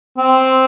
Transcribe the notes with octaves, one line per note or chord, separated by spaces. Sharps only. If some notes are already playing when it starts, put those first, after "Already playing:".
C4